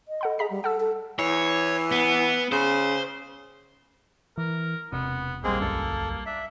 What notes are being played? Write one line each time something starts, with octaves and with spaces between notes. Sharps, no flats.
D#5
A4 F#5 B5
G#4 D#5 A#5 B6
G3
A4 F#5 A5 E6
A4
E3 C#5
B3
C#3 C5
E3 A#4
E1 C3 B3
A#1 G3 G#3 A#3 C4 G#4
C#2 F#2 A4
D4 E5